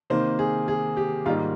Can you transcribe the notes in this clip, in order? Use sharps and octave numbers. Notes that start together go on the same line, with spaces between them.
C3 D#3 A#3 C5
G#4
G#4
G4
G#2 D#3 G3 A#3 F4